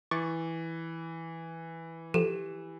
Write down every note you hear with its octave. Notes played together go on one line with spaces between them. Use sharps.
E3 C#6 D6 A6
F3 G4 A4 E7